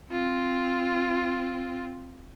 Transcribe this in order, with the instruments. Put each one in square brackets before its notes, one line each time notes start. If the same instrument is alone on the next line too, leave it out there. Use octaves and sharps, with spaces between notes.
[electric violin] C4 F4